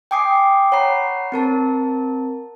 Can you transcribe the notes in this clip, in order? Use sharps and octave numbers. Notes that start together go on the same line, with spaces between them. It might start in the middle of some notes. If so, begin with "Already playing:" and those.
G5 G#5 D6 D#6 C7
C#5 F#5 A#5 B5 C7
C4 A#4 A5